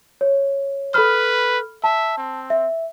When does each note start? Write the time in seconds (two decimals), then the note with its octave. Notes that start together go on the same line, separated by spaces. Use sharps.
0.21 C#5
0.94 A4 B4 B5 F6
1.84 E5 A5
2.18 C4
2.50 E5